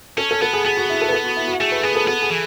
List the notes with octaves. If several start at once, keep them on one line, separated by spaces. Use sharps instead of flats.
C#4 A4
A4
B3 A4
G#4
B3 G#4
F#4
E4
A4
B4
A4
F#4
E4
F#4
A3 G#4
B4
B3 G#4
A4
B3 A4
G#4
E3